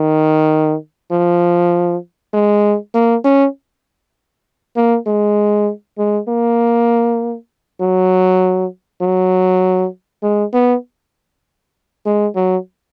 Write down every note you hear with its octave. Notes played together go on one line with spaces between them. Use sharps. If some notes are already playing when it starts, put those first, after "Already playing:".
Already playing: D#3
F3
G#3
A#3
C#4
A#3
G#3
G#3
A#3
F#3
F#3
G#3
B3
G#3
F#3